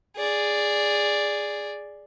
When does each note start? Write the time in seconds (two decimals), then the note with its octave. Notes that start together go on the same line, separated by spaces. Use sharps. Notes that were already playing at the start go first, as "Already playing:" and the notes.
0.17 G#4 D5